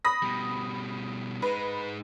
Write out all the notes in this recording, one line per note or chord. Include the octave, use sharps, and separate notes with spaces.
B5 D#6 A#6
B2 G3
G#3 D#4 B4